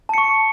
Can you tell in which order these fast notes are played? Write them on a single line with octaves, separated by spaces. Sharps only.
A5 C#7 C#6